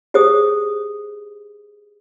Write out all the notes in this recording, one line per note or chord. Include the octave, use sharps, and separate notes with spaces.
G4 G#4 C5 D#6